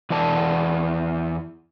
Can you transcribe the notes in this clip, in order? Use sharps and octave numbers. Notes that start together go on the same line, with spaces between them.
E2 E3 D5 A5